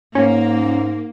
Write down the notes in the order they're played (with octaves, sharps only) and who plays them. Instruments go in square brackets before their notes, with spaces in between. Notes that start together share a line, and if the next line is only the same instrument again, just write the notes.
[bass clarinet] G#2 [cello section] A#3 [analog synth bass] C#4